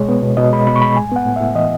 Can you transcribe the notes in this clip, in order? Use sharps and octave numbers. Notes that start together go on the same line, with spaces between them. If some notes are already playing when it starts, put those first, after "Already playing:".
Already playing: B2 G#3 C#5
B3
B2
B2 D#5
G#3 B5
B2 B5
C#6
G#3 B5
A2 G#5
B3 F#5
A2
A2 E5
E3 D#5